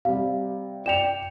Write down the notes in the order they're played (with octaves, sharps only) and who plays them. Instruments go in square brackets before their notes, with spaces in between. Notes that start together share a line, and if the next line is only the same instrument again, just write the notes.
[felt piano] C3 G3 [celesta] F5
[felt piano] D5 G5 C#7 [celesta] E7 F7